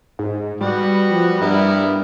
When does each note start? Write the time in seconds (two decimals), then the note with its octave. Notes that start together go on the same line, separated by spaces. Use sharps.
0.19 G#2
0.61 G3 B3 F#4
1.10 F3
1.41 G2 B3 E4 A#4